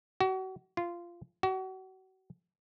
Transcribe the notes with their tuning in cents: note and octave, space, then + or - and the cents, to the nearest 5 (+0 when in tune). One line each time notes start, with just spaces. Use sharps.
F#4 +35
F4 -15
F#4 +35